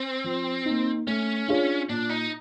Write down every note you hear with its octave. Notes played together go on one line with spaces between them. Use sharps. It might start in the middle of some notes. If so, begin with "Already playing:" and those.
Already playing: C4
F3
A#3 D#4
A3 C#4
D4 F4 G#4 C#5
A#2 D4
D#4